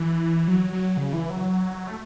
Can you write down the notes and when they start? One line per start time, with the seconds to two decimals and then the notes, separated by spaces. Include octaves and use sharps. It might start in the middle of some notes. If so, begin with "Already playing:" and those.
Already playing: E3
0.48 F#3
0.73 F#3
0.97 C#3
1.13 E3
1.30 F#3
1.87 A3